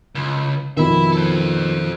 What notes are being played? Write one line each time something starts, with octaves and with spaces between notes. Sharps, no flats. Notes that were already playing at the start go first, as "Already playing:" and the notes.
C#2
F2 B2 D#3 E5 B5
A4 C5